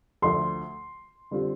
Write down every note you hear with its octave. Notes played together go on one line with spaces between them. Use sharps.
D2 D3 F3 A3 C6
D3 G3 C4 F4